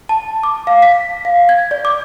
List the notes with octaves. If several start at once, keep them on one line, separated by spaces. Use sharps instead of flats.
A5
D6
F5
B6
F5
G#6
D5
D6